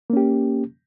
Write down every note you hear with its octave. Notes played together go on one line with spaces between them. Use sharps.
A#3 C#4 G4